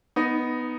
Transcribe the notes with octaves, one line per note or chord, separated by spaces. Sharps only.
B3 D#4